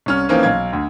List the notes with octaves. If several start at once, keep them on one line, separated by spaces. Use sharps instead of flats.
C2 C#4 F6
E3 F3 A#3 C4 C#4 D#4
B1 F5 G#6
D2